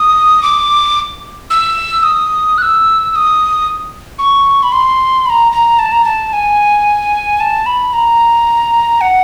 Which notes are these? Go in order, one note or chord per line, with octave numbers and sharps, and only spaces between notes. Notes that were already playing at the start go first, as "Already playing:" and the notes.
Already playing: D#6
D6
E6
D#6
F#6
E6
E6
D#6
C#6
B5
C6
B5
A#5
A#5
A5
A#5
A5
G#5
A5
B5
A#5
F#5